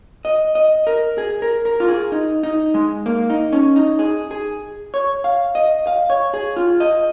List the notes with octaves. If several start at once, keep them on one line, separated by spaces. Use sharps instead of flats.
D#5
D#5
A#4
G#4
A#4
A#4
F4
G#4
D#4
D#4
G#3
A#3
D#4
C#4
D#4
G#4
G#4
C#5
F5
D#5
F5
C#5
G#4
F4
D#5